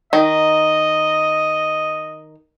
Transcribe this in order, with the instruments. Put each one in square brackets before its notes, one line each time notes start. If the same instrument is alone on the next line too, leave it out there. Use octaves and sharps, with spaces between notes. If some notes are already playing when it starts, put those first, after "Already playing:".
[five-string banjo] D#3 [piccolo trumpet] D#5